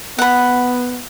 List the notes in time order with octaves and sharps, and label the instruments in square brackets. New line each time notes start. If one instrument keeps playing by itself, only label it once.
[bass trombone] B3 [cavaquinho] F#5 B5